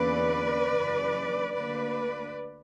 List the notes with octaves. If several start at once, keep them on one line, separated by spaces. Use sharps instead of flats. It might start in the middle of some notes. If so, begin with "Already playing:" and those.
Already playing: E2 D3 A#3 C#4 B4 D5
F#2 C#3 E3 A#3 D4
D2 D3 A#3 D4 B4 D5